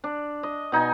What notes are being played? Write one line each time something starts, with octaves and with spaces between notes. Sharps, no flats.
D4
D#5
B2 D#4 G5 G#5